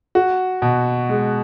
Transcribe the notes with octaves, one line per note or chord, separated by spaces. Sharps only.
F#4
B2
G#3